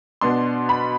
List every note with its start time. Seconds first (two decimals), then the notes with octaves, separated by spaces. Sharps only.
0.21 B2 B3 D4 C6
0.69 B5